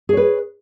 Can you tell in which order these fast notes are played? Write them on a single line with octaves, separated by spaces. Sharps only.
G#4 C#5 B4